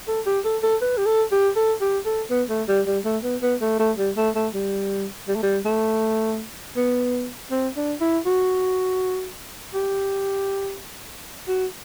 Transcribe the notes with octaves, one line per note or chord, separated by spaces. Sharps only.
A4
G4
A4
A4
B4
G4
A4
G4
A4
G4
A4
B3
A3
G3
G3
A3
B3
B3
A3
A3
G3
A3
A3
G3
G3
A3
G3
A3
B3
C4
D4
E4
F#4
G4
F#4